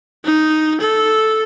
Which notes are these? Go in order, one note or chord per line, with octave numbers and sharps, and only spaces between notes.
D#4
A4